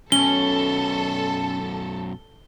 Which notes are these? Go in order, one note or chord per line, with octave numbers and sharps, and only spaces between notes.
F#2 B2 C#4 A4 G7